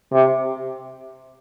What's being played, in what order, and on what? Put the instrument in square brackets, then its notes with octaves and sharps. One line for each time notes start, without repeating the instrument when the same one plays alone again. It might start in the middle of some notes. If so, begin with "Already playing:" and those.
[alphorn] C3